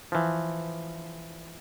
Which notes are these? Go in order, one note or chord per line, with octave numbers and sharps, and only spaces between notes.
E3 F3